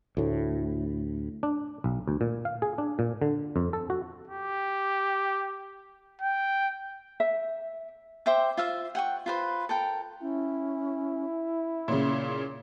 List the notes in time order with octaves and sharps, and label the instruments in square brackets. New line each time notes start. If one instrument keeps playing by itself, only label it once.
[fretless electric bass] D2 A2
[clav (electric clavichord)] D4
B1
D2
A#2
F5
G#4
D4
A#2
D3
F2
A4
F#4
[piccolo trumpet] G4
G5
[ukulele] E5
[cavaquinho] C5 E5 G5 D6
F4 C5 E5 F5
F#5 G5 C#6
F4 B4 C5
A4 A#4 G5
[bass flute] C#4 [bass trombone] E4
[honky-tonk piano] A#2 C#3 [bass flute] C#5